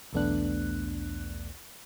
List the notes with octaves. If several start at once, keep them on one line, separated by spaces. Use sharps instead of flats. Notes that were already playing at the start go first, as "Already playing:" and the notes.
B1 E2 A3 B3 D4 F#6